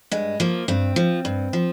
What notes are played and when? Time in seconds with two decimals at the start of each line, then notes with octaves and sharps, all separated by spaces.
0.11 G2 G#3
0.40 F3 A#3
0.68 G2 C4
0.96 F3
1.25 G2
1.53 F3